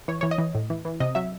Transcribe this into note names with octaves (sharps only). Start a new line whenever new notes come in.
E3 C#5
E3 C#5
D#5
E3
A2
E3
E3
C3 D#5
F#3 E5